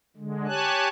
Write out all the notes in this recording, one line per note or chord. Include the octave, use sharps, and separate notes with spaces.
D3 G#3
G4 C#5 G#5 A5 F#6